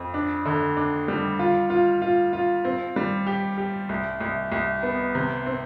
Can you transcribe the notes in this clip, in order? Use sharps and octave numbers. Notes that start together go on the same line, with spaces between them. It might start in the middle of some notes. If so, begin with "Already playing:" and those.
Already playing: F2
D4
D3
D4
G3
F4
F4
F4
F4
C4
G3
G4
G4
C2
C2
C2
B3
C3
C4